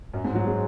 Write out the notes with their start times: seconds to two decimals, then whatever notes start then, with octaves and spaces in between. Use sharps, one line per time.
0.14 F#2
0.24 G#2
0.35 F#3
0.47 G#3